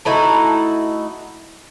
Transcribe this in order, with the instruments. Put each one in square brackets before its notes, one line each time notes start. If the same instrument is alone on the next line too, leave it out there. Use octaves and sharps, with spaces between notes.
[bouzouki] A3 D#4 E4 F#4